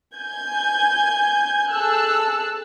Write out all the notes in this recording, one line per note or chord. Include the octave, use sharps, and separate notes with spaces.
G#5 G6 G#6
G#4 A4 A5 E6 F#6